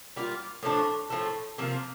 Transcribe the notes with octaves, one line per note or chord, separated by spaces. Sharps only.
G3 A#3 F4
A2 F3 A3 D4
A2 F3 A3
C3 F3 A#3